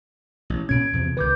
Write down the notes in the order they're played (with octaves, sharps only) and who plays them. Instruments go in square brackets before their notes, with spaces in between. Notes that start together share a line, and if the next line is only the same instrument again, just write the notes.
[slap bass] A1
[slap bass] A#2 C#4 [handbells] G#6 D7
[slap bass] E2 C3 F3
[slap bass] C#2 D#3 [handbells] B4 D6 G6